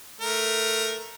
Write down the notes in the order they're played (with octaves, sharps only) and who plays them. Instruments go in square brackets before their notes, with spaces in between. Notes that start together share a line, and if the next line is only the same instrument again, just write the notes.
[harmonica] A3 A#4